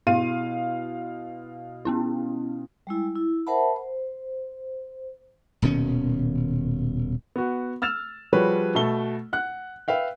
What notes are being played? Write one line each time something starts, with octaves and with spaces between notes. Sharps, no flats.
B2 E4 F5 D#7
B3 C#4 E4
G3 G#3 E4
E4
A#4 C5 E5 F#5 A5 B5
C5
D#1 B2 D#3 C#4
B3 F#4
E6 F6 A6 E7 F7
F3 G3 F#4 G#4 B4 C#5
B2 A3 A4 G7
F#5 F#6
B4 E5 F5 G5